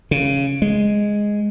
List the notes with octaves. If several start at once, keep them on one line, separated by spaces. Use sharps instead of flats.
C#3
G#3